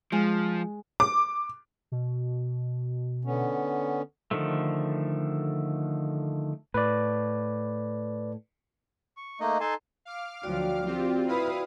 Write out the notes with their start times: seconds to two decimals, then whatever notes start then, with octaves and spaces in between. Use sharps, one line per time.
0.12 F3 G#3
1.00 D6
1.92 B2
3.25 D3 B3 C#4
4.31 D3 D#3 F3 A3
6.74 A2 B4 D5
9.17 C#6
9.40 A3 A#3 D#4 D#5
9.60 D#4 A4 G#5 A5 C6
10.05 F5 D6 F6
10.43 D2 F3 F#3 F#4 D5 G5
10.86 C4 F4 G4
11.28 E4 B4 F5 D#6